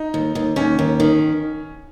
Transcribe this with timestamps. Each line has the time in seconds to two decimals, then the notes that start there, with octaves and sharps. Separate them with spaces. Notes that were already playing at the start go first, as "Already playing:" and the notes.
Already playing: D#4
0.14 D#2
0.35 D#2
0.56 D#2 C#4
0.79 D#2
1.00 D#3